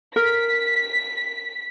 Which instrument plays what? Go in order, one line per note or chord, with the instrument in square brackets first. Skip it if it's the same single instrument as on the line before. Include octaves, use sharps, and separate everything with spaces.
[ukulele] A#4 [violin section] B6